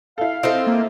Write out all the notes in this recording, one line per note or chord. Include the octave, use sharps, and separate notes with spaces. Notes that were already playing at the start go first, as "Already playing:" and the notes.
E4 A4 F5
C4 E4 F4 A4 C5 D#5
A#3